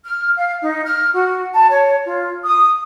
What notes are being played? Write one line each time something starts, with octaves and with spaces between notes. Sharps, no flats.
F6
F5
D#4
F6
F#4
A5
C#5
F4
D#6